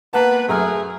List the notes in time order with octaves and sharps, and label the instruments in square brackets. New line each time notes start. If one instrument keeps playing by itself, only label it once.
[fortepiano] A#3 A5 [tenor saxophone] B3 [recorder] B4
[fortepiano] F#2 A#5 F6 [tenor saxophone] A3 [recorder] G#4